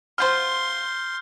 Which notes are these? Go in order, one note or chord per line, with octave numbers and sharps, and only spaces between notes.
B2 F4 C5 C6 F6 G6